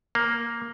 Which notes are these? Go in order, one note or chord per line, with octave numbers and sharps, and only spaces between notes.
A#3